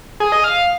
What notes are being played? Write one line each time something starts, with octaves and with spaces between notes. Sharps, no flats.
G#4
D#5
F5